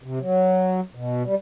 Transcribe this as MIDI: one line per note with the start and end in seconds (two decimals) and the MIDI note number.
0.04 0.19 48
0.21 0.80 54
0.95 1.23 47
1.25 1.35 55